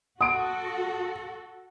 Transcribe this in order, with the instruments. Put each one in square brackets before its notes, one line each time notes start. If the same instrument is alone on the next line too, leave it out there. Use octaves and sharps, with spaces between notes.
[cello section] F#4 A4 [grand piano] F#5 C6 D7 [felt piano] D#6